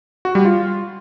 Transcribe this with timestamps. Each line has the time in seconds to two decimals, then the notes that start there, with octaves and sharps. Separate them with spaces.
0.25 F#4
0.35 G3
0.45 F4